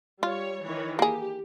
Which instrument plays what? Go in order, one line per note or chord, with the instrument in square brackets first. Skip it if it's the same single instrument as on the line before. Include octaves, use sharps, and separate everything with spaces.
[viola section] G3 C#5 [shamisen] F4
[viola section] D#3 E3 C#5
[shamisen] A#3 G#4 [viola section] G4